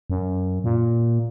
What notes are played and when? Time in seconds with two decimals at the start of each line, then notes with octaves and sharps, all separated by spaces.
0.10 F#2
0.64 A#2